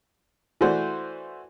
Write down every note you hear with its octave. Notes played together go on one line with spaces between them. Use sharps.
E3 A3 F#4 C5 D5